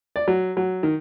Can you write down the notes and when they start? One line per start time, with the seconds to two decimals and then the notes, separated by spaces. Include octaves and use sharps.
0.16 D5
0.28 F#3
0.57 F#3
0.83 D#3